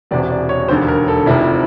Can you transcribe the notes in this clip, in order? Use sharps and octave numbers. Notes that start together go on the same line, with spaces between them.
E1 E2 C3 D5
D5
C#5
E1 D#2 D3 C5
A#4
A4
F1 F2 C3 D#3 E4